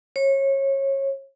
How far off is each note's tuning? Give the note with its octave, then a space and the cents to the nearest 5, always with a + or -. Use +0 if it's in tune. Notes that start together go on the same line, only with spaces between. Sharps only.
C#5 -25